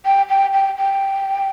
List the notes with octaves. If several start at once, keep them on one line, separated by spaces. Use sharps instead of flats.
G5
G5
G5
G5